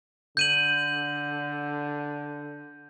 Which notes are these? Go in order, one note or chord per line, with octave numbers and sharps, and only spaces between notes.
D3 G6 D#7 F#7